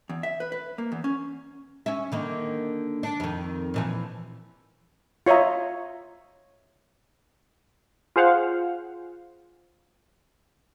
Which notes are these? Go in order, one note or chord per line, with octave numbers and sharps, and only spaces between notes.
E2
E5
B4
B4
A#3
E2
C#4
C#4 E5
D3 D#3 A#3
D4
F2 D#3
A#2 E3 F3
F4 C#5 D#5 E5 A#5
F4 G#4 C5 F5 F#5